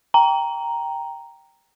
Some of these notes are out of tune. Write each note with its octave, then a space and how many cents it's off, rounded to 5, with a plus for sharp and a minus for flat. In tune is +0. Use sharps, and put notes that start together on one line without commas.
G5 +0 A#5 +0